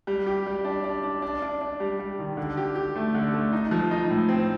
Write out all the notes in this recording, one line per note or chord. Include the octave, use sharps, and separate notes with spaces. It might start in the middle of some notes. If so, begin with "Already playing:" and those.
G3
G4
G3
D4
D4
D4
D4
D4
D4
G3
G3
D#3
D3
G4
G4
A3
D3
A3
D#4
F3
D#4
A2
C4